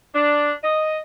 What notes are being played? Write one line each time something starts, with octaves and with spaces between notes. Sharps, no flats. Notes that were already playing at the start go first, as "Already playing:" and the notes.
D4
D#5